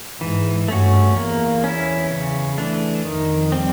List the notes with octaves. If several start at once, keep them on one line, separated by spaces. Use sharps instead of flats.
G#2 E3
G2 A3 C#4 F#4
E2 A#3
C#4 E4
C#3
E3 A3 D4
F2 D#3
G3 C4